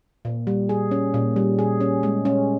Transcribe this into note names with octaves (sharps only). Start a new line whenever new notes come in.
A#2
G3
G#4
C#4
A#2
G3
G#4
C#4
G#3
C#4